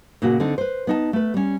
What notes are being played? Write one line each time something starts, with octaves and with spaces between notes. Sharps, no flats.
A#2 C#3 A#3 F#4
D3 C4 D#4 A4
B4 C5
B3 D#4 A5
A3 B4
G3 C#4